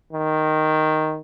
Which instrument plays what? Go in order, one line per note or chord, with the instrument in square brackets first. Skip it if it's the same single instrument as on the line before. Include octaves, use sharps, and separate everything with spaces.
[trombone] D#3